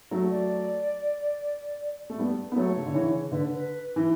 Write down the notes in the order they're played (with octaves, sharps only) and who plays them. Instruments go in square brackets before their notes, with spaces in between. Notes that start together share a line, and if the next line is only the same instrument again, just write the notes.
[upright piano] F#3 A3
[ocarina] D5
[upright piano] A3
G3 B3
B3
[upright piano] F#3 A3 [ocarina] C#5
[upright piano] C#3
D3
C#3 E3
[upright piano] D3 [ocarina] B4
[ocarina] B4
[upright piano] E3